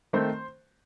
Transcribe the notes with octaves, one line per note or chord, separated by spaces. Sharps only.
D#3 A3 C4 C5